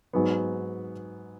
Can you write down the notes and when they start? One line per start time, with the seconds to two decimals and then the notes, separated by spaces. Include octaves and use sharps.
0.13 G#2 F#3 B3